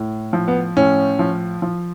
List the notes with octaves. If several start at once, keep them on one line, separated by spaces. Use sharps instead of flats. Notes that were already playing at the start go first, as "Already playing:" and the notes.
Already playing: A2
F3
B3
A2 C#4
F3
F3